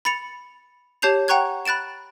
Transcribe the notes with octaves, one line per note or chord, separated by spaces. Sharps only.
B5 A6 C#7 F7
G4 C#5 A5 G6 C7 F7
F#5 G5 A#5 C#6 F#6 G#6
B5 F#6 A6 D7 E7